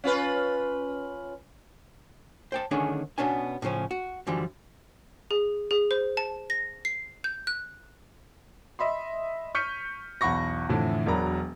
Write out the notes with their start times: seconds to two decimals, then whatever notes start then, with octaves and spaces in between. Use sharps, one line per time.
0.04 C#4 F4 B4
2.52 C5 G5 A5
2.71 D3 D#3 A3 C#4 D4 G#4
3.18 B2 B3 C#4 D4 G#5
3.62 A2 C#3 F3 C#4
3.91 F#4
4.27 F#2 D3 E3 F3 G3
5.31 G#4
5.71 G#4
5.91 C5
6.17 A5
6.50 A#6
6.85 C7
7.24 G6
7.47 F#6
8.79 D#5 E5 B5 C6
9.55 C#6 F6 G6 B6 C#7 D#7
10.21 B1 E2 F#5 B5 C#6 A#6
10.69 F2 A2 D3 E3 E4
11.06 E1 F#3 D4 A#4 A#5 B5